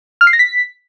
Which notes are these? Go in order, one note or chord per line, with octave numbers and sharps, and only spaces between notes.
F6
C7
A#6
B6